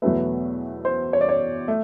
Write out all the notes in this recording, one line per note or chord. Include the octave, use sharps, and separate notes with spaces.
E2 B2 F#3 A3 B4
C5
C#5
D5
C#5
A3